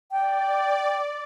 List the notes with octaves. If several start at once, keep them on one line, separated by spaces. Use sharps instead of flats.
D5 G5